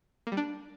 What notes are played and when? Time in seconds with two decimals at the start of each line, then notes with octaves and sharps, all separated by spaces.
0.27 A#3
0.32 G3
0.37 D4